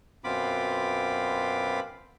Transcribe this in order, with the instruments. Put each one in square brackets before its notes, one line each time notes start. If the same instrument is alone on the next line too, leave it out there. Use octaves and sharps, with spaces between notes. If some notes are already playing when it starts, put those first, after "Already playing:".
[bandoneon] F#2 B2 C4 F4 B5 D6